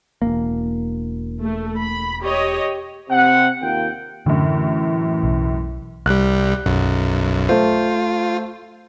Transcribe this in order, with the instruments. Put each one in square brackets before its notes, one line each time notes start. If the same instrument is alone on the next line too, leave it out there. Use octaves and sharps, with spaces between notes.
[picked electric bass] E1 D#2 A#3
[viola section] A3
B5
G4 C#5 D#5
[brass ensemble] C3 C4 F#5
D#2 A#3 F4 G5
[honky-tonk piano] F#2 A2 [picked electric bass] D3 [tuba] E3
[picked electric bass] B1
[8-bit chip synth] C2 G3 [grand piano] F#6
[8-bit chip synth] B1 F#2
[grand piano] A3 C5 [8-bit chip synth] F4